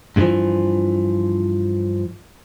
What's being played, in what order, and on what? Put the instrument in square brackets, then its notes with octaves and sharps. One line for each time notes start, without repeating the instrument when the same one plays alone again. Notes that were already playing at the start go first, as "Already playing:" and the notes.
[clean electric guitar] G2 B2 D3 E3 F3